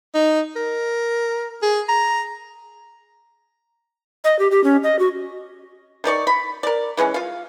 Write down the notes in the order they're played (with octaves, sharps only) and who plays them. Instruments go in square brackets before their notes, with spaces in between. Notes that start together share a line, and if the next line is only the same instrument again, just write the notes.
[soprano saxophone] D#4
A#4
G#4
A#5
[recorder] D#5
G4
G4
C#4
D#5
F#4
[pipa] D#3 D#4 D5 C#6
B5
A#4 D5
E3 G#3 C4 C#4
F4 F5